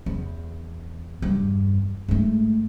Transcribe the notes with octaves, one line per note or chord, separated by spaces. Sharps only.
E2
E2 G2
G#2 A3